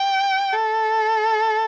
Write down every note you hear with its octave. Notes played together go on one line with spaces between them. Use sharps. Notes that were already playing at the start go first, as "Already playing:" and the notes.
Already playing: G5
A4